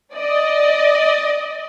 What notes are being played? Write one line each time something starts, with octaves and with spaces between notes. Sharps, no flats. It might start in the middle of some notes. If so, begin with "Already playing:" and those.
D5 D#5